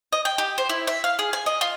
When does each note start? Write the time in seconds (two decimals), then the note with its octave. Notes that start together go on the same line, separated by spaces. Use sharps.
0.13 D#5
0.25 G5
0.38 G4
0.58 C5
0.69 E4
0.87 E5
1.04 F5
1.19 G#4
1.33 G#5
1.46 D#5
1.61 F4